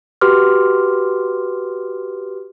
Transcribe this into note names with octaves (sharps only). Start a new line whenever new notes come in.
F#4 G4 B4 C6 D6 F6